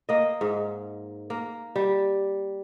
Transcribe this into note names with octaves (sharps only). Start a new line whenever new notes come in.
A#3 D#5
G#2
A#3
G3 G4